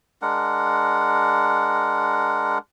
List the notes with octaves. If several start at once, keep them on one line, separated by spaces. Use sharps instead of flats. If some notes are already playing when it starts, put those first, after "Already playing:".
G#3 D4 A#4 F#5